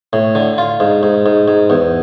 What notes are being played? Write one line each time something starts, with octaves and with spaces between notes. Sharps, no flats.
A2
D3
F4
G#2
G#2
G#2
G#2
E2